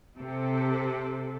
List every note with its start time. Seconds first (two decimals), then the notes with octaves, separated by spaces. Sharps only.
0.19 C3 A4